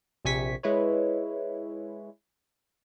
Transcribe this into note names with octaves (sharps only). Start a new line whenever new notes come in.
A#1 C3 G#5 C#6 B6
G#3 E4 B4 C#5